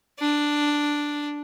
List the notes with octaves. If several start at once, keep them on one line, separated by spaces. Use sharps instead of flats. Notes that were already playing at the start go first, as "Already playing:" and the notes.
D4